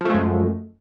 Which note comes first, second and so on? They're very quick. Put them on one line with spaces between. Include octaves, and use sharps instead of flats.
F3 A3 G#3 F#2